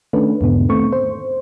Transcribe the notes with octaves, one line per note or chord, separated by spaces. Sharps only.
D#3 A3 C#4 D4 B4
E2 G#2 B2 D3 B3
D#3 A3 C4 C#6
C5